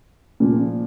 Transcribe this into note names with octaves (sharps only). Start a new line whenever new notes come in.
A#2 F3